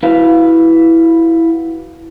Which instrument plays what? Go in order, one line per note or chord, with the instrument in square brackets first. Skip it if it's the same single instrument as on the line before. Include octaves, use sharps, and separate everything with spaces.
[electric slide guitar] E4 F#4 B4 F5